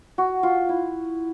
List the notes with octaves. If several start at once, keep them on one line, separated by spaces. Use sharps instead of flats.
F#4
F4
E4